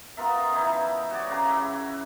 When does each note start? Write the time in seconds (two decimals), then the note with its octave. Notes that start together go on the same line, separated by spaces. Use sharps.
0.17 B3 F4 A#4 E5
0.52 D3 E3 D#4 E4
1.10 F#4 C#5 D5
1.30 C#3 F#4 A#5 D6
1.49 E4 F#4 E5